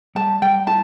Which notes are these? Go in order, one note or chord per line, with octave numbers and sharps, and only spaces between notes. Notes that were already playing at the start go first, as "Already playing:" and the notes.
G3 A5
G3 G5
E4 A5